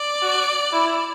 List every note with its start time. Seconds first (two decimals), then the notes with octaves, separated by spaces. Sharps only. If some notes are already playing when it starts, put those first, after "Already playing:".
Already playing: D5
0.22 F#4
0.74 E4